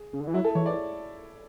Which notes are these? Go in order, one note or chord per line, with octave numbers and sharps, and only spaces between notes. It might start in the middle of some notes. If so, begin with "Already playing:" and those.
Already playing: G#4
C#3
D3
E3
F#3 E4
A4
E3 C#5
D5